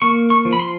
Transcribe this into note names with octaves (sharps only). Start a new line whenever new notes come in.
A#3 C#6
C#6
F3
B5
C6